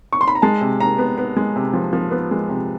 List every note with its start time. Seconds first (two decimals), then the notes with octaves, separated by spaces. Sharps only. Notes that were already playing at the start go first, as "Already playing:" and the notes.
0.13 C#6
0.21 C6
0.28 B5
0.35 A#5
0.42 G#3 A5
0.61 C3
0.79 C3 A#5
0.98 B3
1.18 B3
1.37 G#3
1.56 C3
1.73 F3
1.93 F3
2.11 B3
2.31 G#3
2.49 C3